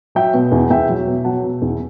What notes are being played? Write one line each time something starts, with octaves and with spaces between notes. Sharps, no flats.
F#3 E5 G5
B2
E2
E2 E5 G5
F#3
B2
F#3 F#5 A5
B2
E2